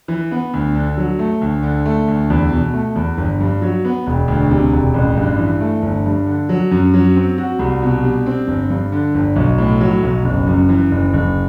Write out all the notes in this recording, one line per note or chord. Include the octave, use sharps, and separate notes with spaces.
E3
B3
D2
D3
F#3
A3
D2
D3
A3
D2
E2
B2
A3
E2
G1
G2
F#3
B3
E1
D2
C3
E1
A1
G2
E3
A3
G1
G2
D3
F#3
F#2
F#3
C4
F#4
C2
B2
G3
C4
G1
G2
D3
G1
B1
A2
F#3
B1
F#1
F#2
E3
F#1
F#1